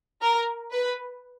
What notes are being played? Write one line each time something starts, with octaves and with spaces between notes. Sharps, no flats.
A#4
B4